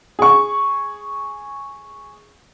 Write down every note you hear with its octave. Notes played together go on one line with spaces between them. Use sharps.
G#4 C#6